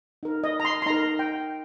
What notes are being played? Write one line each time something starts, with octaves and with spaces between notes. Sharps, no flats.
D#4 A#4
D#5
A#5
C6
C6
D#4 A#4 A#5
G5